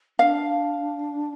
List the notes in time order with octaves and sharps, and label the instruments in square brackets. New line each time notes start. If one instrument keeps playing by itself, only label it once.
[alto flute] D4 [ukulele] F5